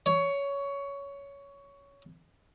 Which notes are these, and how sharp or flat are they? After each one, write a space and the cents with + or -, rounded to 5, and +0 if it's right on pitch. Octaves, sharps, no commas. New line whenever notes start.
C#5 +15